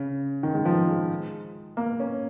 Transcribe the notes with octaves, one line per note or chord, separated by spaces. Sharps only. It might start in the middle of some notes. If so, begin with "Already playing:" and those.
Already playing: C#3
D#3
G#3
F3
G#3
A#3
C#4